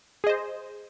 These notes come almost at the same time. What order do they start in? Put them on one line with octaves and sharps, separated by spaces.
G#4 D#5 C5